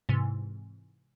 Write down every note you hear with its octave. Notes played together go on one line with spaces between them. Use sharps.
G#2 C3 E3